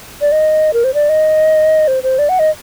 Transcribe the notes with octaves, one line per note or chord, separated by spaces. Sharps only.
D5
D#5
A#4
C5
D5
D#5
C5
C5
D5
F#5
D#5